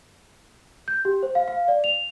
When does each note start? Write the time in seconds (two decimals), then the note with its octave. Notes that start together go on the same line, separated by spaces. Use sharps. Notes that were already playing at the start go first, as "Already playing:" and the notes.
0.88 G6
1.05 G4
1.23 C5
1.35 F5
1.48 F5
1.68 D5
1.84 F7